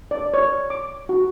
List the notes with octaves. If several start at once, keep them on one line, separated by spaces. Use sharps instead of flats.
D5
C#5
D6
F#4